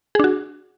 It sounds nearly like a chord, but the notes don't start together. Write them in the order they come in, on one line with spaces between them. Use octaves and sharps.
G#4 D4 F#4